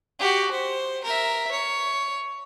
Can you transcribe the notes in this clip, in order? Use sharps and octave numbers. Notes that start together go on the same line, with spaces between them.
F#4 G4
C5
A#4 E5
C#5